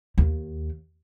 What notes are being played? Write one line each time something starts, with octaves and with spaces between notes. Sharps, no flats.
D#2